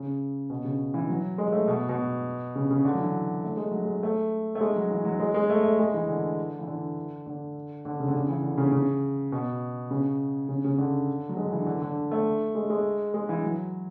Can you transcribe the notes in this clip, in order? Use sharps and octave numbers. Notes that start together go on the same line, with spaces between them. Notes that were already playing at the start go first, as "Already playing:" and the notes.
Already playing: C#3
B2
C#3
E3
F#3
G#3
G#3
A3
B2
B2
C#3
C#3
D3
F#3
E3
A3
G#3
F#3
G#3
A3
A3
G#3
F#3
E3
F#3
G#3
G#3
A3
A3
G#3
E3
D3
E3
D3
D3
D3
C#3
D3
C#3
E3
D3
C#3
C#3
B2
C#3
C#3
C#3
D3
F#3
G#3
D3
E3
D3
D3
A3
G#3
G#3
G#3
E3
F#3